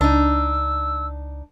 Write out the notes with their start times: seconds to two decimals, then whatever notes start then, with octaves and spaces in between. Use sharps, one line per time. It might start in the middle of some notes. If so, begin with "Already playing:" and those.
0.01 C#2 D4 D#4 E6